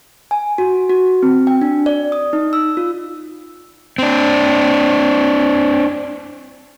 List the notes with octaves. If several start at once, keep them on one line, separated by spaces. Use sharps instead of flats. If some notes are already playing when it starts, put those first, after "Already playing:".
G#5
F#4
F#4
C4
G5
D4
D5
D#6
D#4
E6
F4
C4 D4